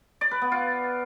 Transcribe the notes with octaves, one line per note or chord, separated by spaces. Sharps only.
D5
B4
B3
F4